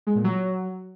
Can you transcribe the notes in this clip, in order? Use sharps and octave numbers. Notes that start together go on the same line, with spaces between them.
G#3
A#2
F#3